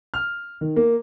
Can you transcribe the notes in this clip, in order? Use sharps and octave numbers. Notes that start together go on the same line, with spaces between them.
F6
D#3
A#3